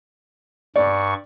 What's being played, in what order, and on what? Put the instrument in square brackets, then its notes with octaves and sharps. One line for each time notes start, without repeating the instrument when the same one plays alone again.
[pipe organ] G2 C#6 [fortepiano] D5